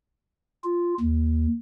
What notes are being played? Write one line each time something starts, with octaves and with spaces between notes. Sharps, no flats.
F4
D#2